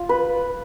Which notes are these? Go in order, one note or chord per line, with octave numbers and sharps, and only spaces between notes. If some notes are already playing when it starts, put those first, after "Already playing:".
Already playing: F4
B4